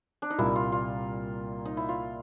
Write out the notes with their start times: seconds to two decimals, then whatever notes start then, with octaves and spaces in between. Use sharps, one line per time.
0.22 D4
0.30 D#4
0.38 C2 A#2 G3 A#3 E4
0.55 F4
0.72 F4
1.65 D#4
1.77 E4
1.89 F4